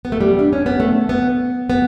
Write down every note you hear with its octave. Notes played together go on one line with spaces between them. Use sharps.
B3
A3
G3
D4
C#4
B3
A3
B3
B3